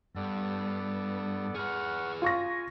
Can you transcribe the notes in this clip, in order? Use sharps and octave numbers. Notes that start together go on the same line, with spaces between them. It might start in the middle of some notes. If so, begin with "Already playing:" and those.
G2 B3 A4 D5
G#4 B4 F#5 C#6 F6
F4 G#5 C#6 A#6